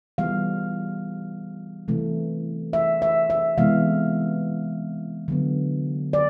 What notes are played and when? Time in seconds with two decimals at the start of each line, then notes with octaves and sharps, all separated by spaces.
0.18 E3 G3 B3 F5
1.88 C3 E3 A3
2.73 E5
3.02 E5
3.30 E5
3.58 C3 E3 G#3 B3 F5
5.28 D3 F#3 B3
6.13 D5